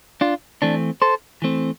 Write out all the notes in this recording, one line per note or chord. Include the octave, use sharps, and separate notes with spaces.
D4 F4
E3 A3 C4 D4
A4 C5
E3 A3 C4